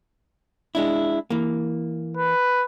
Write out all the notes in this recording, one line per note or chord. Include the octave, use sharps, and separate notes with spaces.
G#3 D4 E4
E3 A#3
B4